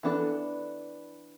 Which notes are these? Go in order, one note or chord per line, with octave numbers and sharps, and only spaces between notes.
E3 B3 D4 F#4 A4